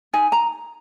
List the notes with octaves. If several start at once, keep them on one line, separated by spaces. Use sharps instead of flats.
D#4 G#5
A#5